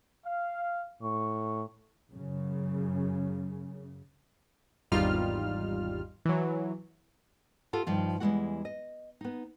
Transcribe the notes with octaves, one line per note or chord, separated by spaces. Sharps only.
F5
A2 C#6
F#2 C#3
G#1 E2 G3 D#4 F4 F6
E3 F#3
F4 G4 A4 F#5
G2 D#3 F3 F4
E2 G3 G#3 E4 F#4 F#5
D#5
B3 D#4